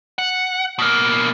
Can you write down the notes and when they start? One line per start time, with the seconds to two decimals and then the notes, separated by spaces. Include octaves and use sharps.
0.18 F#5
0.79 B2 A#3